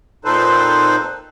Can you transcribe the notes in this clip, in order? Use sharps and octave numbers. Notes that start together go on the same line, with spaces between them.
A#2 C4 D#4 A4 B4 C5